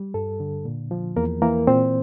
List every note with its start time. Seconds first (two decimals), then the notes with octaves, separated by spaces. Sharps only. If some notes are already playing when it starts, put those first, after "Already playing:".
Already playing: G3
0.14 G2 A4
0.40 D3
0.65 A#2
0.91 F3
1.16 E2 A#3 A#4
1.42 E3 A#3 A#4
1.67 A#2 C4 C5